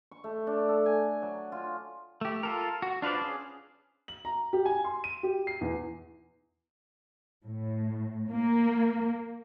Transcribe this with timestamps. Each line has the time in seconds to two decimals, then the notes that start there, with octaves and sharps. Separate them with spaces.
0.11 C#6
0.24 A3
0.47 D4
0.69 A4
0.86 G#5
1.22 F#3
1.52 F4
2.21 A3 G4
2.43 F4 A4 A#4
2.82 F#4
3.02 D4 F4 B4 C5 D5
3.22 C#4 G#4
4.08 F#7
4.25 A#5
4.53 G4
4.66 G#5
4.84 C6
5.04 D#7
5.23 G4
5.47 C7
5.61 E2
7.45 A2
8.31 A#3